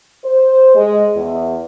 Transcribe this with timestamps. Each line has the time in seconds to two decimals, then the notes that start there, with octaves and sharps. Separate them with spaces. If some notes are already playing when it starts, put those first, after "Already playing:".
0.24 C5
0.75 G#3
1.15 E2